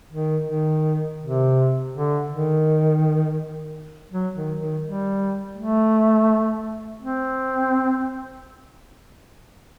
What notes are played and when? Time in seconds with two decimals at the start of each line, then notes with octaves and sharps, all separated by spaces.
0.12 D#3
0.48 D#3
1.21 C3
1.94 D3
2.29 D#3
4.12 F#3
4.35 D#3
4.60 D#3
4.84 G3
5.57 A3
7.02 C4